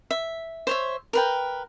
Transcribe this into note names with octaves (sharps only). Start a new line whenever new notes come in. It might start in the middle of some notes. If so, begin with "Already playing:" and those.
E5
C5 C#5 E5
A#4 B4 G5